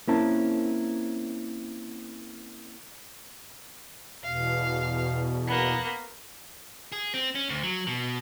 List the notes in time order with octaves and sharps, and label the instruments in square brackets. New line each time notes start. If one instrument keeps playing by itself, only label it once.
[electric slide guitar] A#3 C4 C#4 E4 A#4 A5
[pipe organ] E2 B2 [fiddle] F5
[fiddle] A#3 B3
[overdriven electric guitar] G#4
C4
C#4
D2
F#3
B2